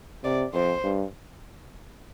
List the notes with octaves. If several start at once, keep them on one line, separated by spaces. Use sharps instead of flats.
C3 D5
F2 C5
G2